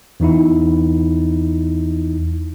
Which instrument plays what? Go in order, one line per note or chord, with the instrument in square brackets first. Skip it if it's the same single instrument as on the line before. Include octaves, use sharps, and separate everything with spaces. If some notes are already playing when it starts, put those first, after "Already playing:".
[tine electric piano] E2 E3 D#4 E4